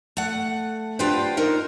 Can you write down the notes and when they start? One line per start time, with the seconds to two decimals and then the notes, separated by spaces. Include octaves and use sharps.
0.17 A3 F#5
0.99 B3 D4 F4 G4 B4 C5
1.37 D#4 F4 A#4 C5